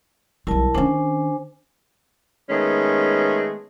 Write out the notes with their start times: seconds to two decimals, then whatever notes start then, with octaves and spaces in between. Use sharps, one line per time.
0.47 B1 G3 E4 A#4 A5
0.74 D#3 C#4 D4 C5 G#5
2.50 D#3 G#3 A3 B3 C#4